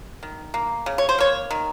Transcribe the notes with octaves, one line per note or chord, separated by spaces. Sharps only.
D#3
A#3
C#3
C#5
C5
A#3 C#5
D#3